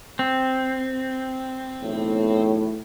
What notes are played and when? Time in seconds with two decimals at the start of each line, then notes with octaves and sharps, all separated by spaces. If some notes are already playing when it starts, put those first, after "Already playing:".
0.19 C4
1.82 B1 E2 A2